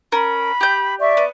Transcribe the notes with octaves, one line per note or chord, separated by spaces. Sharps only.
C#4 A#4 B5
G4 G6
D5 E5 C#6
B3